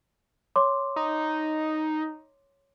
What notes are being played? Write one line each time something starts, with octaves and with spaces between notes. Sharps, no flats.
C#5 C6 D6
D#4